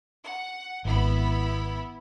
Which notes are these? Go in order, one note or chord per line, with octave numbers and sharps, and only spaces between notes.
F#5
G#1 B3 E4 B5